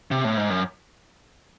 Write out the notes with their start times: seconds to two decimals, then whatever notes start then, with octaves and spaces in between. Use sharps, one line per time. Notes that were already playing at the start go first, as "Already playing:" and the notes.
0.11 C3
0.25 A2
0.37 G#2
0.50 F#2